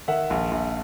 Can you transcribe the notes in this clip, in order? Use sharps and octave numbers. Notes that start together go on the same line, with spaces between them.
D#3 E5 F#5
A#1
A#1